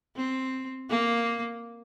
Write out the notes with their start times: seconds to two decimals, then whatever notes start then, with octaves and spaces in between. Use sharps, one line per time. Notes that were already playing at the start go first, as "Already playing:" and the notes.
0.16 C4
0.90 A#3